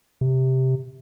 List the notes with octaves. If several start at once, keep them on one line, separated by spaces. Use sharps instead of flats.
C3